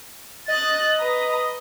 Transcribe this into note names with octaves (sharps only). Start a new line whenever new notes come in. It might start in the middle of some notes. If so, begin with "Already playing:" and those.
D#5 F#6 A6
B4 A#5